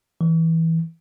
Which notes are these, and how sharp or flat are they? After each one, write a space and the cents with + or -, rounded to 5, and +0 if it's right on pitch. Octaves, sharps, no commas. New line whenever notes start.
E3 -15